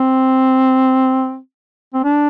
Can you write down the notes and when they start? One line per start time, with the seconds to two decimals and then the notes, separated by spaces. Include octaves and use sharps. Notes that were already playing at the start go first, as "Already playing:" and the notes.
Already playing: C4
1.94 C4
2.04 D4